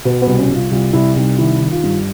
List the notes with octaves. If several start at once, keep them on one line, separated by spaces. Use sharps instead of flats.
B2 B3
B3
C2
C#4
C2 F4
C2 F4
C2 E4
C2 D#4
D#3 E4
D#3
F4
G2